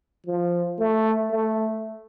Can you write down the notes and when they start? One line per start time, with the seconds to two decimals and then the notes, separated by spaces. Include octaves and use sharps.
0.26 F3
0.79 A3
1.31 A3